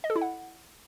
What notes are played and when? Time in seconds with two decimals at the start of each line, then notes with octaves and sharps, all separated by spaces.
0.04 D#5
0.10 A4
0.16 E4
0.21 F#5